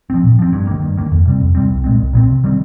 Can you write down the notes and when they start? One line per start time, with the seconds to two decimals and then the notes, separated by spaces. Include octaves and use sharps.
0.10 F3 C4
0.24 A#2
0.39 F3 C4
0.53 G2
0.67 D#3 A#3
0.82 G2
0.97 D#3 A#3
1.12 F2
1.25 C3 G3 C4
1.41 F2
1.55 C3 G3 C4
1.70 C2
1.84 A#2 G#3 C4
1.99 C2
2.13 A#2 G#3 C4
2.28 C3
2.44 D#3 G3 C4